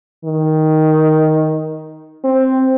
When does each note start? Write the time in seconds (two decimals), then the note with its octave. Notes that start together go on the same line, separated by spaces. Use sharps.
0.25 D#3
2.24 C4